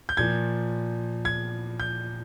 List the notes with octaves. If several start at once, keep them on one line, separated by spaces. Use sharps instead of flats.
G6
A#2 F3 G#6
G#6
G6